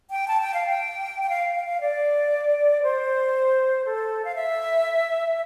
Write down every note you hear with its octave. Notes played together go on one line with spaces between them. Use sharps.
G5
A5
G5
F5
G5
G5
F5
F5
F5
D5
C5
A4
F5
E5